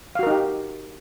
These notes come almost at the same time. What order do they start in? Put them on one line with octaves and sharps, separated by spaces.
F5 F#4 A#4 D#4 G4